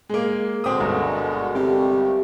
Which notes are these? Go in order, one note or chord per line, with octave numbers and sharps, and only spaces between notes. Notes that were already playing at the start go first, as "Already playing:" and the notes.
G#3 A#3
B2 D3 G#3 C4 D#6
G1 G#2 A#4
C3 G3 A3 G4 F5